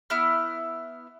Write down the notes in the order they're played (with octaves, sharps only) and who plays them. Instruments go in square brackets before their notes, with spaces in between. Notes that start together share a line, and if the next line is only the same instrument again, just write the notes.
[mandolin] B3 E4 F6